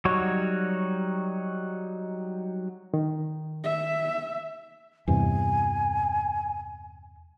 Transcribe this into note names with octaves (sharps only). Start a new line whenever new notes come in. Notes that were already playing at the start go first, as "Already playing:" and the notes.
F#3 G3 D#4 F#4 C#5
D#3
E5
E2 G2 C3 G#5